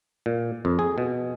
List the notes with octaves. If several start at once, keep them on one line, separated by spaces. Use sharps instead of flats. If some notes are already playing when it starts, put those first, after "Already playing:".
A#2
F2
G#4
B2